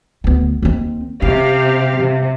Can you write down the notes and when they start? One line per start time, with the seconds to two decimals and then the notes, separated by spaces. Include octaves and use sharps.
0.24 D2 B3
0.62 D#2 C4
1.22 C3 C#4 G4 F5
1.98 C3